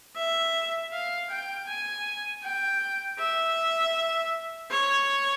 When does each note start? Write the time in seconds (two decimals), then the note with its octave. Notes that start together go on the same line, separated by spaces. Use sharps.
0.16 E5
0.93 F5
1.30 G5
1.67 G#5
2.44 G5
3.19 E5
4.71 C#5